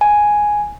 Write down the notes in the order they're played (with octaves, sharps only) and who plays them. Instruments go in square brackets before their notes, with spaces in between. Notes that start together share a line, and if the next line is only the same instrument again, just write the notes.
[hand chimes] G#5